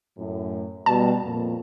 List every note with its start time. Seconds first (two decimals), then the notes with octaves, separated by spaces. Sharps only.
0.18 F#2 A2
0.86 B2 G3 A5
1.23 F2 A#2